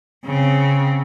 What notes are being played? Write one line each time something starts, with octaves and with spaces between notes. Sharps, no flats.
C#3 C4